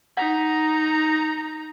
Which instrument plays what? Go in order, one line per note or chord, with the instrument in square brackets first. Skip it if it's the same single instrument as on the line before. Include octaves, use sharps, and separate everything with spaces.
[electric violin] D#4 A#5 [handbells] F#5